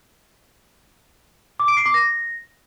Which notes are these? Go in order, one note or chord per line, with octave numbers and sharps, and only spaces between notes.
D6
D7
C7
D6
A#6